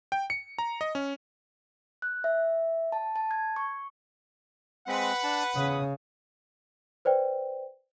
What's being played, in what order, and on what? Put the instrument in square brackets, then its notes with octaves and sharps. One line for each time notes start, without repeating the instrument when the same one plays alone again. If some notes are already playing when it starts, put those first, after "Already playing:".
[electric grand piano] G5
C#7
A#5
D#5
C#4
[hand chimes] F#6
E5
A5
A5
G#6
C#6
[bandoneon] G#3 C4 [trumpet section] B4 F#5
[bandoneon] D4 A5
[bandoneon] E2 D#6 [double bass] C#3
[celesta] B4 C5 D5 G5